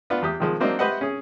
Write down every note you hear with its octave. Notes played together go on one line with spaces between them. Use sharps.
B3 D4 F4
E2 G4 D#6
D#3 F3 G#3
F#3 A#3 C4 D4 D#4
G4 B4 C5 D#5 E5 F#5
C#4 G#4